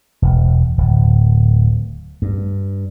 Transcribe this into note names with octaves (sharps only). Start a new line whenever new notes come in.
E1
D1
G2